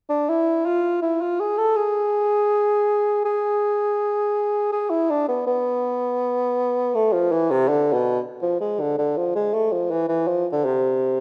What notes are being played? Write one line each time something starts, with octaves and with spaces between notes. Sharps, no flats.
D4
E4
F4
E4
F4
G#4
A4
G#4
G#4
G#4
E4
D4
B3
B3
A3
F3
E3
C3
D3
B2
F3
G#3
D3
D3
F3
G#3
A3
F3
E3
E3
F3
D3
C3